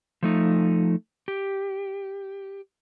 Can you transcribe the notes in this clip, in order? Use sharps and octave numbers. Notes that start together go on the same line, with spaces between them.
F3 A3 D#4
G4